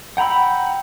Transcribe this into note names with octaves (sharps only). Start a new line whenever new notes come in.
F#5 G5 A#5 B5 E6